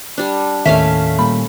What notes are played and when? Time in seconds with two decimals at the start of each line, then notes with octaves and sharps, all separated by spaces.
0.18 G3 D4
0.65 D#2 A2 D#3 A3 C#4 E5 F5 B6
1.19 A#2 G3 A#3 B5